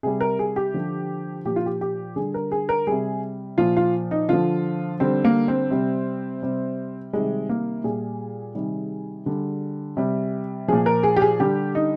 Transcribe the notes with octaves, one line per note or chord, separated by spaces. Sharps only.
C3 G3 G#4
A#4
G#4
G4
D3 F3
A#2 F3 G4
F4
G4
G4
D3 G3 G#4
A#4
G#4
A#4
C3 G3 G#4
A#2 F3 F4
F4
D#4
D3 F3 F4
D3 G3 C4
A#3
C4
C3 G3
C3 G3
C3 D#3 G3 G#3
A#3
A#2 G3 G#4
C3 D#3 G3
D3 G3
C3 G3
A#2 F3 G#4
A#4
G#4
G4
G#4
D3 G3 G4
D#4